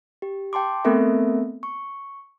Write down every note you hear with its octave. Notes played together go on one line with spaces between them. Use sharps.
G4
G5 A5 C6 D6
A3 B3 C4 A4 A#4 E5
C#6